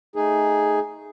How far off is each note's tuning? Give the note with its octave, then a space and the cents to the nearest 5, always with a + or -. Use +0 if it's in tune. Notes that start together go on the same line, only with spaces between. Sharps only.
A3 +0 D#4 +0 G#4 +0